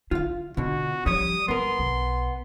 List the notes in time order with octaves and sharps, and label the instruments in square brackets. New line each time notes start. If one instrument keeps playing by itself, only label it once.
[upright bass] D3 [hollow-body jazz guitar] F4 F5
[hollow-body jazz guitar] B2 D3 [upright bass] F4 [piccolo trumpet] F#4
[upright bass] F3 C#4 [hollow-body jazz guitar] G3 C#5 [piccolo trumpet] D#6
[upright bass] G3 [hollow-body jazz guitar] B3 A#4 [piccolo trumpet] C6
[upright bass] B1